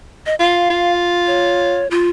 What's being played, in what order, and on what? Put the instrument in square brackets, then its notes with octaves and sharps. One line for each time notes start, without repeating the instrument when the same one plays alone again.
[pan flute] D#5
[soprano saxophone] F4 [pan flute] F5
[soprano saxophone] F4
[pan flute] C#5
F4